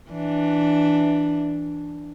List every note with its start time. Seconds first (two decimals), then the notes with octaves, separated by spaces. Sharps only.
0.11 E3 D4